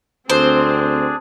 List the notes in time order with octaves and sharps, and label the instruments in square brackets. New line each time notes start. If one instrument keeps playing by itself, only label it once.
[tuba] D2 [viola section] C4 [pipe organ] D4 G#4 [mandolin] C5